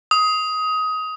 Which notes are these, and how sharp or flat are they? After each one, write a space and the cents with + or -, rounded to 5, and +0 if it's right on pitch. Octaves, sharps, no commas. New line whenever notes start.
D#6 +20